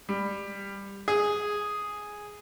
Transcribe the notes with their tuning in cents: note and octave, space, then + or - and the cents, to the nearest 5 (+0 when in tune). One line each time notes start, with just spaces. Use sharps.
G3 +15
G#4 +0